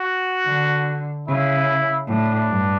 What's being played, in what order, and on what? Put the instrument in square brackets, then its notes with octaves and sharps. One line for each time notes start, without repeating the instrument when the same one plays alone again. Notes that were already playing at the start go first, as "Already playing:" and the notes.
Already playing: [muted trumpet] F#4
[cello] D3
[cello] C#3 [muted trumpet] E4
[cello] A2 [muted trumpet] D4
[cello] G2